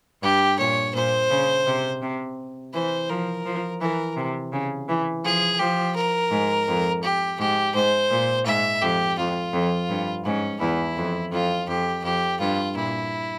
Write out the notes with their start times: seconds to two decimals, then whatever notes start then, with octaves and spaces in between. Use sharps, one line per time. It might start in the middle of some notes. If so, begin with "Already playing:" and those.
0.22 G2 G4
0.59 A#2 C#5
0.94 A#2 C5
1.30 C#3
1.66 C3
2.02 C3
2.74 E3 C5
3.09 F3 A#4
3.45 F3
3.81 E3 A#4
4.16 C3
4.52 C#3
4.89 E3
5.24 F3 G#4
5.59 F3 G4
5.95 A#4
6.31 G#2
6.68 F2
7.03 G4
7.39 G#2 G4
7.75 G#2 C5
8.11 A#2
8.46 G#2 E5
8.82 F2 G4
9.18 F2 F4
9.53 F2
9.89 G2
10.25 G#2 C#4
10.60 E2 E4
10.97 F2
11.32 F2 F4
11.68 F2 G4
12.04 F2 G4
12.40 G2 F4
12.75 A#2 E4